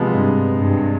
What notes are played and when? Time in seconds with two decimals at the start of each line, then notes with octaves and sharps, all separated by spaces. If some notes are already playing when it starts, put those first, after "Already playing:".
Already playing: C3 F3 G#3 B3
0.13 G2
0.53 G2